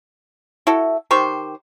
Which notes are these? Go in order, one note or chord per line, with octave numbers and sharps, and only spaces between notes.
E4 F#4 A4
D#3 G4 C5 C#6